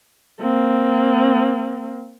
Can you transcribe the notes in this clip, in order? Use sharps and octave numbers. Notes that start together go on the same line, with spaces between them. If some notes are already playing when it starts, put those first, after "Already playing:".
A#3 C4